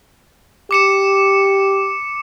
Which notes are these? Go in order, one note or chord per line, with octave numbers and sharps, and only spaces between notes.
G4 D6 C#7 E7